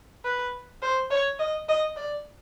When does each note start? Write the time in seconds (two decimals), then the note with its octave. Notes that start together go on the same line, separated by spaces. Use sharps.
0.25 B4
0.82 C5
1.11 C#5
1.39 D#5
1.68 D#5
1.96 D5